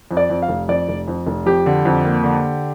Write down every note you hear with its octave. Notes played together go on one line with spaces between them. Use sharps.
F2
D5
F2
F5
F1
F2 D5
F1
F2
F1
F2 G4
D3
F2
A#3
D3